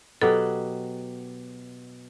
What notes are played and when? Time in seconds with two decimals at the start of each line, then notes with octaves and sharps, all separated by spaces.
0.21 B2 F#3 G4 A4